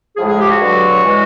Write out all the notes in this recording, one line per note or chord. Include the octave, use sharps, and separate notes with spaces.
A2 F3 G#3 G#4
G#4
G4
F#4
G2 D3 F#3
E3 G#3